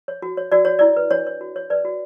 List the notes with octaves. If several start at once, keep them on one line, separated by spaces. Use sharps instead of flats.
C#5
F#4
C#5
F#4 D5
F#4 C#5
E4 D5
B4
D4 C#5
C#5
F#4
C#5
B4 D5
F#4